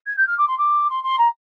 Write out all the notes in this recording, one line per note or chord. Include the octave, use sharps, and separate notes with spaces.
G#6
G6
F6
D6
C6
D6
C6
C6
A#5